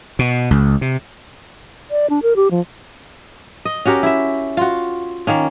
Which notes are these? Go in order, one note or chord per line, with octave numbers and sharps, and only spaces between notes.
B2
C#2
C3
D5
D4
A#4
G4
F3
D#5
C#4 F#4 G4 A#4
E4 E5
F4 F#4
D#3 A#3 C#4